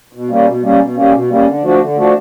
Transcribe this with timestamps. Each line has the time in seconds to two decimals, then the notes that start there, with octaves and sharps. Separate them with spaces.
0.13 B2
0.29 G3 A#3 C#4
0.45 B2
0.63 G3 A#3 C#4
0.79 B2
0.96 G3 A#3 C#4
1.13 B2
1.29 G3 A#3 C#4
1.46 D3
1.62 F3 A3 D4 F#4
1.80 D3
1.96 F3 A3 D4 F#4